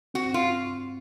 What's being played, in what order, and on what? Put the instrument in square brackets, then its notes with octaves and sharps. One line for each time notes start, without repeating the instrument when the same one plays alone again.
[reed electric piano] C4 [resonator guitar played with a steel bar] F#4
[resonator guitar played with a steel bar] F4